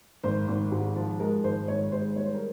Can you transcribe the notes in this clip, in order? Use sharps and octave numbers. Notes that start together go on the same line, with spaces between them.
G#1 C5
G#1
G#2
F3
G#3 A#4
G#1 C5
G#1 C#5
G#3 C5
G3 C#5
C5
A#4